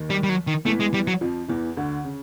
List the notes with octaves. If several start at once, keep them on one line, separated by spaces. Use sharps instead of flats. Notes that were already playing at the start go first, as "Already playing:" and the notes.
Already playing: D#2 D#3
G3
G3
F#3
D#3
E2 E3 A3
G#3
G3
F#3
F2 F3
E2 E3
D2 D3
C#3